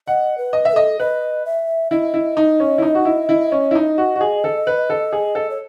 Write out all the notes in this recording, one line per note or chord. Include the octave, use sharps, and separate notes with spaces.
D#5 F#5
B4
D#5
B4 E5
A4 D#5
B4 D#5
E5
E4 D#5
E4
D#4
C#4
E4
D#4
F#4
E4
E4
C#4
E4
D#4
F#4
F#4
G#4
A4
B4
A4
G#4
A4
C#5